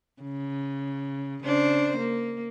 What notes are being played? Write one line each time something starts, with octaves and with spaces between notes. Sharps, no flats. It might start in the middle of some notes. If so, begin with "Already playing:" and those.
C#3
C#3 D4 C5
A#3